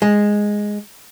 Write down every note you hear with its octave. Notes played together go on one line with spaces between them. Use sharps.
G#3